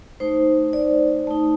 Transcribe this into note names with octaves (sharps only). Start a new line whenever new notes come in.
A3 D#4 C5
D5
A3 D#4